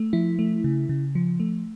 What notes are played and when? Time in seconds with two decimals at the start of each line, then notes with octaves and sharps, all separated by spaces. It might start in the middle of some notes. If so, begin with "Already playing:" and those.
Already playing: A3
0.13 F3 E4
0.39 A3
0.64 C#3
0.89 C#3
1.15 F3
1.40 A3